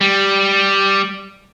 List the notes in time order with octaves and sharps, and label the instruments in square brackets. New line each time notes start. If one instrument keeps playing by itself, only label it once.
[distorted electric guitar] G3